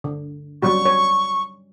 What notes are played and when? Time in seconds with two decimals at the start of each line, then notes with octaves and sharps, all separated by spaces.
0.04 D3
0.63 F#3 G3 G4 C#6
0.86 C#5